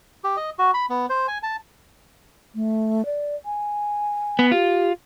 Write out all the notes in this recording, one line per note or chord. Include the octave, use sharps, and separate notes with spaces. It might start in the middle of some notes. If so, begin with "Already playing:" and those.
G4
D#5
F#4
B5
B3
C5
G#5
A5
A3
D5
G#5
B3
F4 G4